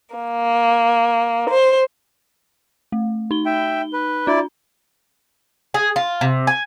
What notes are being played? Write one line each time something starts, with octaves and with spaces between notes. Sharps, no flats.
A#3
C5
A3
D#4 G7
E5 G5
B4
D4 E4 D5
G#4
F4
C3
G#5